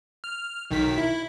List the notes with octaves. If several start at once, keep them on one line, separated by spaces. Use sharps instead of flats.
F6
B1 D#3 B6
E4